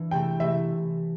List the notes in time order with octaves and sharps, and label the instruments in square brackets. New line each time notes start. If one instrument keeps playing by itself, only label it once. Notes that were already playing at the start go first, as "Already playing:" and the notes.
Already playing: [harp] E3 D4
[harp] C3 A3 E4 [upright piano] G5
[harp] C3 A3 E4 [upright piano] E5